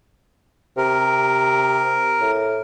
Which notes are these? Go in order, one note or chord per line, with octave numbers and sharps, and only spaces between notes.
C3 A#4
A2